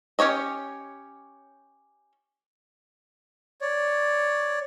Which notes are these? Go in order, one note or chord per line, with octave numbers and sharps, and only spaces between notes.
C#4 G4 C#5 D#5
C#5 D5